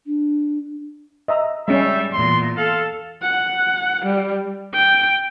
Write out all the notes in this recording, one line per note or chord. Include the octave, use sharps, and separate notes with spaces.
D4
D#5 E5 A#5
G3 G#3 C#4 E5
E2 A#2 C6
A4 F5
F#5
G3
G5